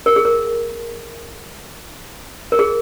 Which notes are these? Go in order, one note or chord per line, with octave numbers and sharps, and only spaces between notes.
A#4
G#4
A#4
A#4
G#4